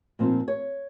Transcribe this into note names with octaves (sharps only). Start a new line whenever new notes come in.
A#2 F3 C4 D#4
C#5